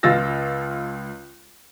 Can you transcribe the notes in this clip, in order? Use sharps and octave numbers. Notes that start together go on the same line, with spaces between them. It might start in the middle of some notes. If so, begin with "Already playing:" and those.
C#2 F4 E6 A6 A#6